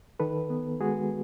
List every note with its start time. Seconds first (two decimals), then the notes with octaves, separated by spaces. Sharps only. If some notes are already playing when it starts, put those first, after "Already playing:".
0.20 D#3 A4 B4
0.50 B3
0.80 G#3 F#4 G#4